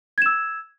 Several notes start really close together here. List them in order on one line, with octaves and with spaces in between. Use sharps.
G#6 E7 E6